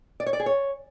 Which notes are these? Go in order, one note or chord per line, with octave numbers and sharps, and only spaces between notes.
D5
C#5
D5
G#4
C#5